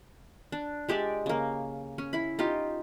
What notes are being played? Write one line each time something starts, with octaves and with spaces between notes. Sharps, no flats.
D4
G#3 G4 D5 E5
C#3 A#3
C#4
E4 B5
D#4 F4 G4